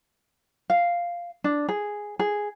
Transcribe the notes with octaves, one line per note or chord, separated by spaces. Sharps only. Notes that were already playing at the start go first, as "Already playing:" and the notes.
F5
D4
G#4
G#4